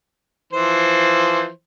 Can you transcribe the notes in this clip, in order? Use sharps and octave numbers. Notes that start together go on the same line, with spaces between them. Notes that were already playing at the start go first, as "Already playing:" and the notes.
E3 F3 C5